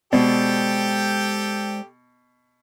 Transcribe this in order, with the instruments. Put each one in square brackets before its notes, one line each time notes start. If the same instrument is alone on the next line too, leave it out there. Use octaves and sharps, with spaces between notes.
[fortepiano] B2 [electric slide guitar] G#3 C5 D5 [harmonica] G4 A4 G5